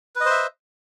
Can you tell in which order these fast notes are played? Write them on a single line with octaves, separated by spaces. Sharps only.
B4 D#5 C5 E5